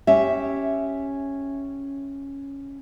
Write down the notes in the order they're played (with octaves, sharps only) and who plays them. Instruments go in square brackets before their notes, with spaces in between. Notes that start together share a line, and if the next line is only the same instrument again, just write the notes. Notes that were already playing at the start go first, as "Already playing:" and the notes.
[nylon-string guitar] C#4 G4 E5